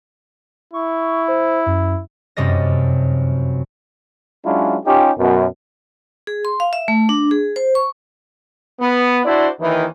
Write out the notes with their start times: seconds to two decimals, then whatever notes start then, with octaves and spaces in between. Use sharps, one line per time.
0.74 E4 C#6
1.28 C5
1.66 F#2
2.37 F1 F#2 C3 G3 D#5 A#6
4.45 F#3 G#3 C#4 D4 E4 F4
4.85 C#4 D#4 F4 G4
5.18 F#2 B2
6.27 G#4
6.45 C6
6.60 F5
6.73 E5
6.88 A3
7.09 D4
7.31 G#4
7.56 C5
7.75 C#6
8.81 B3
9.25 D4 E4 F#4 C5 D5
9.60 D#2 D#3 E3